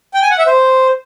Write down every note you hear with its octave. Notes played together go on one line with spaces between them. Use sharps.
G5
G#5
F#5
E5
C5